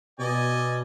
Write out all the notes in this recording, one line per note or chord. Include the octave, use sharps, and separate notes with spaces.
B2 D5 D#5 G#5